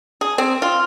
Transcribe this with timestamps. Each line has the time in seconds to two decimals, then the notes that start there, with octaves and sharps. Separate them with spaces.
0.21 G#4
0.38 C4
0.62 F4